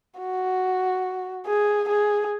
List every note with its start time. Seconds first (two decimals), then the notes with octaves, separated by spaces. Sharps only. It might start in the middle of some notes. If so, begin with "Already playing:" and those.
0.20 F#4
1.46 G#4
1.89 G#4